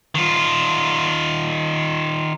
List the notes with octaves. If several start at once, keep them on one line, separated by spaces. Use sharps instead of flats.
D#3 F4